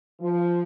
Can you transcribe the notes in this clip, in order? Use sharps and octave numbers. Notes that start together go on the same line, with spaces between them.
F3